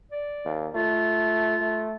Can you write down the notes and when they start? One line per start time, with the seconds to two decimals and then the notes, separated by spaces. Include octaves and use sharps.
0.11 D5
0.45 D#2
0.75 A3 F4
1.62 A3